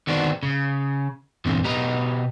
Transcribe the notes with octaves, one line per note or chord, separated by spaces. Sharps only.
D3 D#3 B3 C4 D4 F#4
C#3
E2 G2 A#2 D3 C4
B2 G4 B4 D#5 A#5